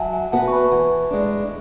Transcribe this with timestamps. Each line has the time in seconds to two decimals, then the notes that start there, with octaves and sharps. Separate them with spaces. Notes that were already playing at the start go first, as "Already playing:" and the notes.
Already playing: F#3 E5 F#5 G#5 A5
0.13 E5 G#5
0.32 B3 F#4 B4 F#5 A5
0.48 C#6
0.52 G#5 B5
0.72 E3
1.11 G#3 D4